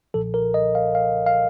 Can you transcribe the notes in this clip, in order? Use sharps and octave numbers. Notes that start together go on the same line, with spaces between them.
B1 A#2 F3 A4
A#4
D#5
F5
F5
F5